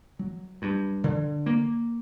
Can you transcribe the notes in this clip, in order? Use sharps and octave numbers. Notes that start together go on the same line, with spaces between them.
F#3
G2
D3
A#3